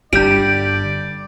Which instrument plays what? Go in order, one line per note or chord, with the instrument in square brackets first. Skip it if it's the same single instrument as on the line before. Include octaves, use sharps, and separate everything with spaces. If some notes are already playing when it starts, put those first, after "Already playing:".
[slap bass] G1 D4 [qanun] G3 [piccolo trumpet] D5 [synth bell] G6 D7